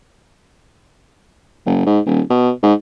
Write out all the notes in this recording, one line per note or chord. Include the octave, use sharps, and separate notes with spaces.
F#1
G#2
D#1
B2
G#2